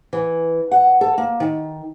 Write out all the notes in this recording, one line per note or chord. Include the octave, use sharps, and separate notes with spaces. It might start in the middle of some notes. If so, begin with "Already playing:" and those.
E3
F#5
A4
A#3
D#3